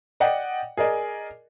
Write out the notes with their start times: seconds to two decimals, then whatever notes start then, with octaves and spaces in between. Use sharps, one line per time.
0.20 D5 D#5 F#5 G5
0.77 G#4 A#4 D5 D#5